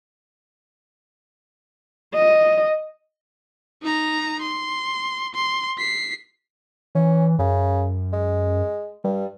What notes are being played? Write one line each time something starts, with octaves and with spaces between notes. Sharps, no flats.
D#5
D#4 A#5
C6
C6
B6 C7
E3 C#4
F#2 C#3
G#3
G2 G3